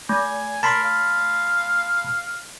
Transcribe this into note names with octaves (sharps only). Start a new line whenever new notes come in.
A3 G#5
A#4 A5 B5 C6
F5